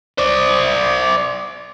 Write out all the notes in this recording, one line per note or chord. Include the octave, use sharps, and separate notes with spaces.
C5 D5